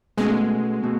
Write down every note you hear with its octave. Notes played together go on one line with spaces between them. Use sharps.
B2 G#3 A3 C#4
B2 A3